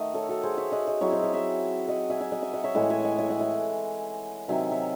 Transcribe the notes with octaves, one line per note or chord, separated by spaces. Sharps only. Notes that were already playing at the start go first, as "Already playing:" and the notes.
Already playing: D#3 A3 D#5 F#5
A4 C#5
F#4 A4
G#4 C5
C#5 E5
D#5 F#5
D#5 F#5
F#3 C4 E4 C#5 E5
C5 D#5
C#5 E5
E5 G#5
D#5 F#5
E5 G#5
E5 G#5
D#5 F#5
E5 G#5
D#5 F#5
C#5 E5
A2 E3 G#3 D#5 F#5
E5 G#5
D#5 F#5
E5 G#5
D#5 F#5
E5 G#5
C3 D#3 F#3 E5 G#5
C#5 E5